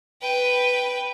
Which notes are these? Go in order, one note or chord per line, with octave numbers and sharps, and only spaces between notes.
B4 G5